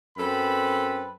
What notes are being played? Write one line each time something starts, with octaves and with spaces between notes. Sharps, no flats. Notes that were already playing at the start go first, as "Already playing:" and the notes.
F#2 C4 A4 B4 B5